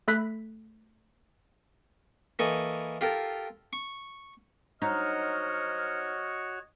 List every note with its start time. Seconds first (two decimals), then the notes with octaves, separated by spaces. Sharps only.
0.08 A3 A4 B5 F#6 B6
2.39 E3 A#3 A4 D#5 C#6
3.01 F4 G4 A4 A#4
3.73 C#6
4.82 F#3 D#4 F#4 C5 C#5 D#5 F6